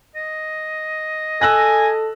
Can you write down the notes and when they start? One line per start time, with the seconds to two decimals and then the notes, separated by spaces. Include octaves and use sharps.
0.16 D#5
1.41 A4 G#5 E6 F#6 A#6